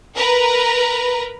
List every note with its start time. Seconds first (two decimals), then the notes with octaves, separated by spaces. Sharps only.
0.16 A#4 B4 A#5